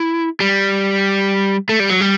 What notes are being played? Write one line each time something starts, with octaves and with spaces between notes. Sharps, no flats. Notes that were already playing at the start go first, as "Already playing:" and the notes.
Already playing: E4
G3
A3
G3
F#3
G3